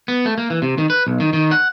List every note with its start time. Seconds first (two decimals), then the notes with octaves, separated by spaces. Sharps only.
0.08 B3
0.26 A3
0.38 A#3
0.50 E3
0.62 C3
0.78 D#3
0.90 B4
1.07 B1
1.20 D#3
1.33 D#3
1.51 F#5